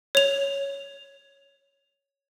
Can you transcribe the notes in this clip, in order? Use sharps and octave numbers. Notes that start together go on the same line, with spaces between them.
C#5 F7